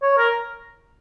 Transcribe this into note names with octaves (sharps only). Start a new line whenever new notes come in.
C#5
A#4